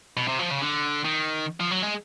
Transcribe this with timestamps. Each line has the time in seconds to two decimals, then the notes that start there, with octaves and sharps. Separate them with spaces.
0.17 B2
0.28 C3
0.39 F3
0.51 C#3
0.61 D3
1.05 D#3
1.60 F3
1.71 F#3
1.83 G#3